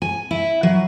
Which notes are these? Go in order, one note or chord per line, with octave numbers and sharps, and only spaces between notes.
G#5
E4
F#3